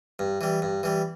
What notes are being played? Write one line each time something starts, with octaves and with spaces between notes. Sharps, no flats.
G2
E3 G3
G2
E3 G3